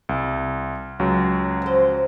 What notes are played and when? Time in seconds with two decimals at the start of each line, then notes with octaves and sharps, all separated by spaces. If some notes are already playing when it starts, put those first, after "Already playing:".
0.09 C2
0.99 C#2 F#3
1.62 F3 C5